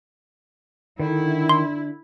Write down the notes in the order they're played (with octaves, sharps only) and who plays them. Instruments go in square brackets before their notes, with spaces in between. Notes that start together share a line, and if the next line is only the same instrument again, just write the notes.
[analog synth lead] D3 [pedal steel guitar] D#3 [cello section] E4
[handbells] C6